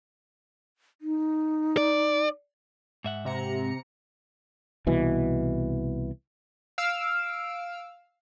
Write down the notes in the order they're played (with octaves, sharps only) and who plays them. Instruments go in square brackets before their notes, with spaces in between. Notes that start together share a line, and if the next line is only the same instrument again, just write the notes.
[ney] D#4
[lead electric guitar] D5
[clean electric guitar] G#2 E5 F#5
[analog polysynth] C3 A#5 C#7
[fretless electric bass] C2 B2 E3
[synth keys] F5 E6 F6 D7